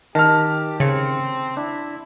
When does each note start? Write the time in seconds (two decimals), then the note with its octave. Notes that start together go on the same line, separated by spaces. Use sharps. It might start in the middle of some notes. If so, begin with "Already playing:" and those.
0.15 D#3 G4 A#4 A5 A#5 F6
0.80 C#3 C4 C#7
1.57 D4 E4